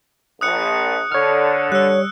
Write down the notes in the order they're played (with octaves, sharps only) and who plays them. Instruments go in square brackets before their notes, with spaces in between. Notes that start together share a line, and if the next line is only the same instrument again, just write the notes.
[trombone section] A#1 [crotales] D#6 F#6 C#7
[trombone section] D3 [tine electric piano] C#5 F6
[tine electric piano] G3 [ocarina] C#5 [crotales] E6 F#6